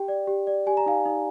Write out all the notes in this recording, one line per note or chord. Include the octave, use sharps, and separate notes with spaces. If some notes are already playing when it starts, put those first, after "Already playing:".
Already playing: G4 G5
D5
G4
D5
G4 G#5
A#5
D#4 F5 G#5
D#4